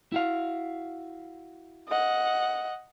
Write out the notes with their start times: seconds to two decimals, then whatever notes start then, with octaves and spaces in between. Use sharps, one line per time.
0.12 E4 F#4 F5
1.88 D#5 F#5